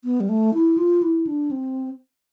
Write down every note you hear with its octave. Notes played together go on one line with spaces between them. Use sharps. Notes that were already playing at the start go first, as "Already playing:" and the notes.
B3
G3
A3
E4
F4
E4
D4
C4